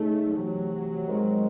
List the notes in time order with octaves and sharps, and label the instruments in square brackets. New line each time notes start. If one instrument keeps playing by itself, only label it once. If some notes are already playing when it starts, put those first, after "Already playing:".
Already playing: [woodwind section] C#3 G#3 D#4 [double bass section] A3
[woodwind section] C3 E3 A3 [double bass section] F#3
[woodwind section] G#2 D#3 G#3 C4